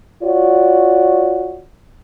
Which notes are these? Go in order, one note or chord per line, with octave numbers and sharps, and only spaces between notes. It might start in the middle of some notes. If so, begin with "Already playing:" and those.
F4 F#4 C#5 D5